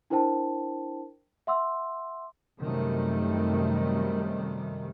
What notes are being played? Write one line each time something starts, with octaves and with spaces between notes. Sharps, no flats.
D4 E4 A#4 C5 G5 A5
E5 F#5 C6 D6 E6
F#2 C3 D#3 G3 A3